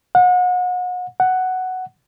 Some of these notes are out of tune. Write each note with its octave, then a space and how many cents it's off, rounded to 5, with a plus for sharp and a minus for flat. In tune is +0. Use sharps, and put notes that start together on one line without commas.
F#5 -35
F#5 +5